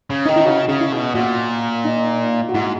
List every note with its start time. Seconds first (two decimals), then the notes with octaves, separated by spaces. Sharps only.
0.10 C#3
0.26 D#3 D#4
0.36 E4
0.45 C#3 F#4
0.68 C#3
0.81 E4
0.92 B2
1.15 A#2 F#4
1.85 D#4
2.49 F#4
2.54 G#2 E4